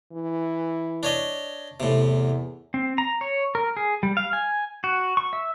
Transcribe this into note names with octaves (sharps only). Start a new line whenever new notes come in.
E3
D4 C#5 D#5
E2 A2 C3
C4
A#5
C#5
A#4
G#4
G3
F5
G#5
F#4
C#6
E5